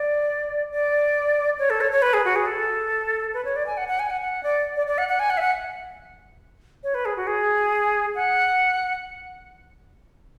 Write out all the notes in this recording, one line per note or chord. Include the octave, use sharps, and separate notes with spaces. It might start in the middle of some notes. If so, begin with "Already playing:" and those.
Already playing: D5
D5
C#5
A4
C#5
C#5
B4
G#4
F#4
G#4
A4
B4
C#5
D5
G#5
F#5
F#5
G#5
F#5
F#5
D5
D5
D5
F#5
F#5
G#5
F#5
E5
F#5
C#5
B4
G#4
F#4
G#4
F#5